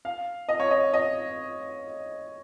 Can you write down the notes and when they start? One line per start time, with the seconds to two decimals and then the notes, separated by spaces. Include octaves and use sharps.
0.05 F5
0.49 D#5
0.60 C#5
0.71 D#5
0.93 D#5